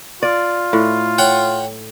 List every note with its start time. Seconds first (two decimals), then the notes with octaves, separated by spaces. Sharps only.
0.23 F4 D5
0.73 A2
1.18 C#5 F#5 G5